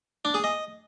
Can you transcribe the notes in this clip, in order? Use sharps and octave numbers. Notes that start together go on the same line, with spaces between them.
D4
G#4
D#5